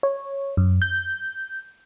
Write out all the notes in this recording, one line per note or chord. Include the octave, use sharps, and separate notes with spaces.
C#5
F#2
G6